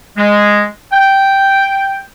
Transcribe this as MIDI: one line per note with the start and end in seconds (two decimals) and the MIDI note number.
0.17 0.64 56
0.93 2.02 79